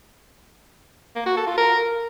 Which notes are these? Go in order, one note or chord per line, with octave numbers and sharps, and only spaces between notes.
A#3
F#4
A4
F4
A#4